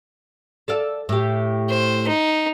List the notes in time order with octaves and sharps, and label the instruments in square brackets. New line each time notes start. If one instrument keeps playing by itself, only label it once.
[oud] A4 D5 F5
A2 G4
[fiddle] C5
D#4